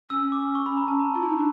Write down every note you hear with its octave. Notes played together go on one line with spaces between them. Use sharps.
C#4 E6
D6
C#6
B5
A#5
A5
A#5
F4
E4
D#4
D4